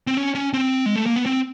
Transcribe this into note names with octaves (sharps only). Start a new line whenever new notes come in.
C4
C#4
C#4
C4
G#3
A3
A#3
B3
C4